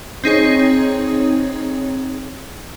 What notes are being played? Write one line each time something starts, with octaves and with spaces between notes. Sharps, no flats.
C4 D#4 G#4 C#5